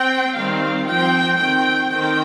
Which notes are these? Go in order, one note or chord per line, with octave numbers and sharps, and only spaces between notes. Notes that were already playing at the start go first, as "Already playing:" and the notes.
Already playing: C4 G5
D#3 G3 C4 F5
F3 C4 G5
D#3 C4 G5
D#3 C4 G5